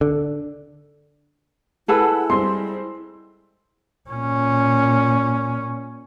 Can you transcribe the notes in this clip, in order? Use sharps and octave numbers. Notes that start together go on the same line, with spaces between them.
D3
E4 G#4 A4 B4 F#5 B5 E6
G3 G#3 C4 C6
A#2 C#4